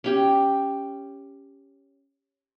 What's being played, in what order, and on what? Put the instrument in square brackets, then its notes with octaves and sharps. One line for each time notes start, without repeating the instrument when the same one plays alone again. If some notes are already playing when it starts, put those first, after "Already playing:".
[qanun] C#4 G4 G5